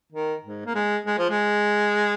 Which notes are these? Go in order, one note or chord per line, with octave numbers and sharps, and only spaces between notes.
D#3
G#2
A#3
G#3
G#3
F3
G#3